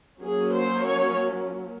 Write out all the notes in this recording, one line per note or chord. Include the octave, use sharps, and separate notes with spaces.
F#3 A#3 C#4 G#4
C5
C#5